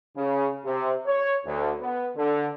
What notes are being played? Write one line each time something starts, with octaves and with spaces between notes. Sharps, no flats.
C#3
C3
C#5
D2
B3
D3